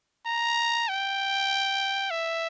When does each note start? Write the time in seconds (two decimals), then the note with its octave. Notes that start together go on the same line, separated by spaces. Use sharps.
0.26 A#5
0.89 G5
2.11 E5